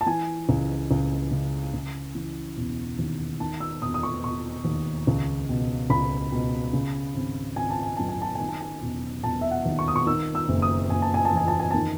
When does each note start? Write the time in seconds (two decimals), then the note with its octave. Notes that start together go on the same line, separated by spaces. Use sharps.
0.01 A5
0.06 E3 G#5
0.49 C#2
0.91 C#2
1.31 C#3
1.74 C#3
2.15 E3
2.57 E1
2.99 D#2
3.40 D#3 A5
3.60 E6
3.81 E1 D#6
3.94 D#6
4.03 C#6
4.23 E1 C#6
4.65 D#2
5.07 C#2
5.49 B2
5.90 C#2 B5
6.32 B2
6.73 C#3
7.15 G#1
7.56 G#1 G#5
7.70 A5
7.83 G#5
7.97 F#2 A5
8.09 G#5
8.22 A5
8.35 D#3 G#5
8.49 A5
8.61 G#5
8.81 E1
9.23 E1 A5
9.41 E5
9.51 F#5
9.65 D#2
9.79 C#6
9.88 D#6
9.96 C#6
10.07 D#3 E6
10.35 E6
10.49 F#1
10.62 D#6
10.90 F#1 G#5
11.02 A5
11.14 G#5
11.25 A5
11.33 E2 G#5
11.48 A5
11.60 G#5
11.71 D#3 A5